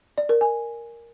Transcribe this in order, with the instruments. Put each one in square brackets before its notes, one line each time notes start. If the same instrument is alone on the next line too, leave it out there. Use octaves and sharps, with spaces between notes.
[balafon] D5
A#4
G#5